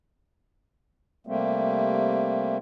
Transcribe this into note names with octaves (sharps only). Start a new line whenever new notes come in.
C3 G3 A3 A#3 C4